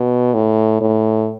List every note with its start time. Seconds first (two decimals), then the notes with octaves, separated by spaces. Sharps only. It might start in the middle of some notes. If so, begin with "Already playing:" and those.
Already playing: B2
0.34 A2
0.81 A2